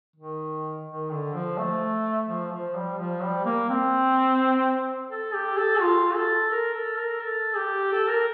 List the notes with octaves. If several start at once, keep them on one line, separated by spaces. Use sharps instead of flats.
D#3
D#3
D3
F3
A3
F3
F3
G3
F3
G3
A#3
C4
A4
G4
A4
F4
A4
A#4
A4
A#4
A4
G4
A4
A#4